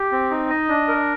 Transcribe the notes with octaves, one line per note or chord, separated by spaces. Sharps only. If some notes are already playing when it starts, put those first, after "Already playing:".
Already playing: G4
C4
D#4
D#5
D4
A#4